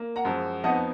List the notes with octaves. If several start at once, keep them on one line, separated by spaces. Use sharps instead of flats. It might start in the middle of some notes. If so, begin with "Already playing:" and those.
Already playing: A#3
F#5 A#5
F#2 F3 G#3
F2 F3 B3 D#4 D#5 F#5